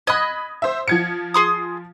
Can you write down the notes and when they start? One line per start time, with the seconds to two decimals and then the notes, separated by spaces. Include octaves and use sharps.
0.07 D#5 B5 D#6 F#6 G#6
0.62 C5 E5
0.88 F3 G#6 C#7
1.34 G#4 C6 D#6